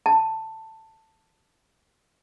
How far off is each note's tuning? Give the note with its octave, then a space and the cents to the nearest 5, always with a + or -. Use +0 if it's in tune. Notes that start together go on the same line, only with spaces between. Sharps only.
A5 +10